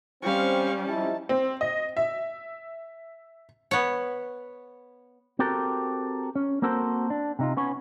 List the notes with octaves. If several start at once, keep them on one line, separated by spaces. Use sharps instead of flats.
G3 C4 C#4 F5 C#6
F3 D#4 E4 A5
C4
D#5
E5
B3 C#5
C4 F#4 G4 A4 A#4
C#4
A#3 C4 F#4 A4 A#4 C5
D4
C3 D#4 F4
B3 C#4 C#5